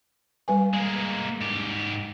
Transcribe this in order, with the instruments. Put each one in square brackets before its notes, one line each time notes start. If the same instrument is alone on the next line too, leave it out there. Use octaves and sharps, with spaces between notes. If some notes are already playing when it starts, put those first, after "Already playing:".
[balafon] G3 B4 G#5
[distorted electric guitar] G#3 A#3
G#2 G4